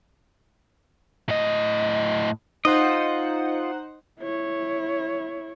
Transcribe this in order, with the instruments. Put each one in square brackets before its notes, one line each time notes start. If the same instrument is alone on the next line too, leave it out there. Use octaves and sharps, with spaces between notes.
[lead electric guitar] A2 D#5
[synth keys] D#4 C5 F#5 [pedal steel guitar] F4 D#5
[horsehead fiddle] E4 C#5